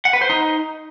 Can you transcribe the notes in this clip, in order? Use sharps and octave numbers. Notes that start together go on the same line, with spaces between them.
F#5
B4
C5
D#4